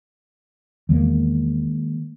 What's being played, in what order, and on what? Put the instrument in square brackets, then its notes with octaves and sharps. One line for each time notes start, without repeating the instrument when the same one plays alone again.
[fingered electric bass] E2 [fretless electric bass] D#3 G#3 A#3